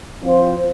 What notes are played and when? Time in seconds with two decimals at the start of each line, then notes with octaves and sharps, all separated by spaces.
0.23 F3 C4 F4 C5